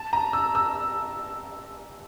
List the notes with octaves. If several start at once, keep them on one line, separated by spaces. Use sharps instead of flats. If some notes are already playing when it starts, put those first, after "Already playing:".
Already playing: A5
A#5
E6
E6